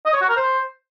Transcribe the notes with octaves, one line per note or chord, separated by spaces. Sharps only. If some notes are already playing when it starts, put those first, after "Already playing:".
D#5
C#5
F#4
A#4
C5